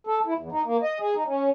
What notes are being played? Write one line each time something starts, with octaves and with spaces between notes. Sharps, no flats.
A4
E4
E2
D#4
A#3
D#5
G#4
D#4
C#4